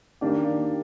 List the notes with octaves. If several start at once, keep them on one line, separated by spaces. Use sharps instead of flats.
D#3 A#3 D4 G4